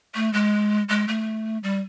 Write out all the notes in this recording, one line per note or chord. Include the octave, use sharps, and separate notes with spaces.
A3
G#3
G#3
A3
G3